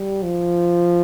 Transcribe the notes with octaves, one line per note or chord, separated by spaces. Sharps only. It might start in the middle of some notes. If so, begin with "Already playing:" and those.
Already playing: G3
F3